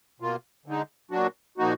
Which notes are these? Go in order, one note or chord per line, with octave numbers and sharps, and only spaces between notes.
B2 A#3 F4
D3 G#3 D#4
A#2 F#3 D4 F#4
A#2 F3 A#3 D#4 F#4